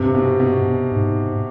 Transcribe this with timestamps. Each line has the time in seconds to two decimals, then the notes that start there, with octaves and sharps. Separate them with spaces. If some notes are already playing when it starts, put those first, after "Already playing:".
Already playing: G2 C3
0.15 B2
0.40 B2
0.91 G#2